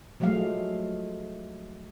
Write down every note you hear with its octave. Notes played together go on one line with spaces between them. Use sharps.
F3 F#3 G#3 A3 F5